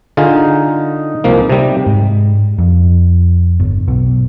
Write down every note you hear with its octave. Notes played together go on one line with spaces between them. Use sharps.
D3 D#4 F4 G#4
C2 F3 A#3
C3 G3
G#2
F2
G1
B1